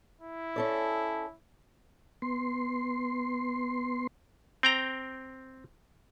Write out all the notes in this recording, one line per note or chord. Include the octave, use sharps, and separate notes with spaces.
E4
C#4 A4 D5
B3 C6
C4 G5 A#5